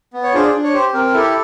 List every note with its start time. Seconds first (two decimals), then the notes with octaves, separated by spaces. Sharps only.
0.13 B3
0.23 C#5
0.34 D4 F4 G#4 C5
0.43 D5
0.53 D4
0.64 C#5
0.74 G4 C5
0.93 C4 A#4
1.14 E4 G4 A4